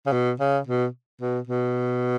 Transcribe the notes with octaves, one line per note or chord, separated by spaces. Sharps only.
C#3
B2
C#3
B2
B2
B2